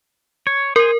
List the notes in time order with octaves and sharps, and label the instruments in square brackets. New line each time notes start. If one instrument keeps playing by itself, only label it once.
[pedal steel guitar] C#5
[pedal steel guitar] G#4 C5 [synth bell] A#4